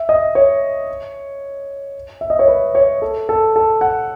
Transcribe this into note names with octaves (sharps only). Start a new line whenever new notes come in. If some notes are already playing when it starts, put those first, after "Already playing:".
Already playing: E5
D#5
C#5
E5
D#5
C#5
B4
C#5
A4
A4
A4
F#5